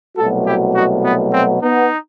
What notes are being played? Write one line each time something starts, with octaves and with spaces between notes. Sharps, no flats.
C2 B2 F#3 A3 F#4 A4
E4 G4
D#4 F#4
B3
C4
B3 D#4